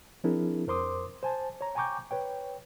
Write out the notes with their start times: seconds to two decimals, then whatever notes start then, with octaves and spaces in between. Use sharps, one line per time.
0.24 F3 C4 D4 E4 G#4 A#4
0.67 F2 A#4 C5 C6 D6 D#6
1.23 C5 G#5 A5
1.61 C#5 A#5
1.75 G5 G#5 A#5 C#6 D6 G6
2.11 B4 C#5 G5